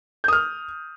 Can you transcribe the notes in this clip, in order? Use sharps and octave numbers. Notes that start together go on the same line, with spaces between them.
D#6 F6 G6